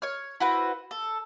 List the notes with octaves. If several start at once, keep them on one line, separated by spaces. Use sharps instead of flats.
C#5 F6
E4 F#4 B4 C5
A4